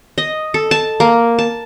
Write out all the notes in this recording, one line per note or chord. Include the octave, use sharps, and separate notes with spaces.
D#5
A4
A5
A#3
A5